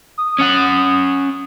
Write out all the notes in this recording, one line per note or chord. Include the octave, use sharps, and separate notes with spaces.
D#6
C#4 F#5